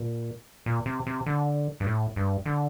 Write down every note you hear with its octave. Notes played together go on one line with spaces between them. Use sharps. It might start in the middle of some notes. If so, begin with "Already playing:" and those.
Already playing: A#2
A#2
C3
C3
D3
G2
A2
G2
D3